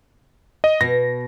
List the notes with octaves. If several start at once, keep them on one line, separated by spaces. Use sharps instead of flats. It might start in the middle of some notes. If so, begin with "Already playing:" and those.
D#5
B2 A#6